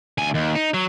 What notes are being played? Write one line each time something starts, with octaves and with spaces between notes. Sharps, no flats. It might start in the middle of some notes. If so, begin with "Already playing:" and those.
D2 G#5
D#2
D#4
F#3